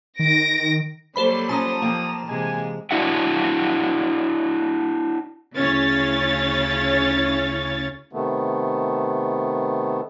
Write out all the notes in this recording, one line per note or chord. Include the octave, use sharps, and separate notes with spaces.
D#3 A#6 D7
F#3 G3 A#3 A4 C5 B5
C#4 F4 F#5 A5 A#5 D#6
F3 A#3 C4
C3 E3 G#3 G#5
D4 E4 F#4 E5 F#5
D2 C#3 C#4 E4 C#5 A6
C3 D#3 A3 B3